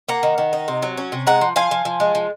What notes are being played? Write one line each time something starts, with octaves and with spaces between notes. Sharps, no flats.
A#3 F#5 A#5
D#3
D#3
D#4
C3
F#3
C#4
C3
G#3 F#5 A#5
F3
F3 F5 G#5
F3
F3
G#3
F3